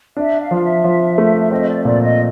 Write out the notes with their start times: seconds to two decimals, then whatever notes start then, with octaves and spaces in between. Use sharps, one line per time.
0.17 D4 E5
0.39 F5
0.51 F3 F5
0.61 E5
0.84 F3
1.18 A3
1.40 E5
1.51 C4 D#5
1.67 D5
1.85 A#2 D5
2.02 D#5